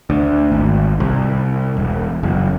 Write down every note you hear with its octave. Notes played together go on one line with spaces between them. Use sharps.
D2
G#1
C2
E1
F#1